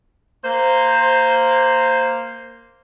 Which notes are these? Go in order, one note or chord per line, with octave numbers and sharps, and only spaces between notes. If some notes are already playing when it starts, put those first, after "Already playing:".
A#3 C5